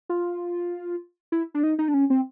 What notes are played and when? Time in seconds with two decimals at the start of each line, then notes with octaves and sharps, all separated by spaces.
0.09 F4
1.32 E4
1.54 D4
1.63 D#4
1.79 D#4
1.88 D4
1.94 C#4
2.10 C4